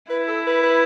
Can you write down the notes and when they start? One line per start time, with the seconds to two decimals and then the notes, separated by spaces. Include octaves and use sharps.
0.10 E4 B4
0.27 A4
0.46 B4
0.63 B4